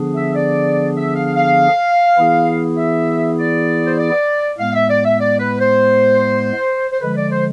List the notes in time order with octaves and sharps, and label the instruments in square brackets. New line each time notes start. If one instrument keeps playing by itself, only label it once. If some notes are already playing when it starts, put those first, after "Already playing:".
Already playing: [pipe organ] D3 F3 B3 D4 G#4
[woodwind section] E5
D5
E5
F5
F5
[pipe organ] E3 B3 E4 G#4
[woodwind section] E5
D5
C5
D5
[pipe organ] A2 G#3 B3 [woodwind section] F5
[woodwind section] E5
D5
E5
D5
B4
C5
C5
[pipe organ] D3 F3 G#3 [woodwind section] B4
[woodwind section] D5
C5